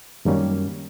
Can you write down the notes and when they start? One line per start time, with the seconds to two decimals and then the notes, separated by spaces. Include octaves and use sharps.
0.25 F#2 D#3 G3 A#3 C#4